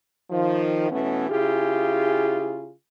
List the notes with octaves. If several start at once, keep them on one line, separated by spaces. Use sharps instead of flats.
D#3 F3
B2 E3 A3 B3 C#4
C#3 E4 F4 G4 G#4